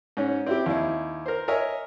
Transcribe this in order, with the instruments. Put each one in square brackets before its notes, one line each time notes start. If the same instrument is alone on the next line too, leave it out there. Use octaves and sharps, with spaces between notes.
[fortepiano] G#2 C#4
C4 E4 G4
D#2 D#4 E4
A#4 C5
A#4 C#5 D#5 E5 G#5